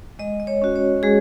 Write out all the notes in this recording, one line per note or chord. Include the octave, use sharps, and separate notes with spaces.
G#3 D#5
D#5
C#5
C#4 F#4
C#5
G#3 G#4